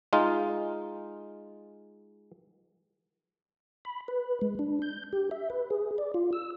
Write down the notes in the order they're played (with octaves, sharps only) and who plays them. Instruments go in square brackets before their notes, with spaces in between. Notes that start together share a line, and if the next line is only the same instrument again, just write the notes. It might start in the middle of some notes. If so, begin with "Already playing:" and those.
[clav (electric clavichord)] G#3 D#4 F4
[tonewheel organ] B5
B4
G#3
D4
G6
G4
E5
B4
G#4
D5
F4
E6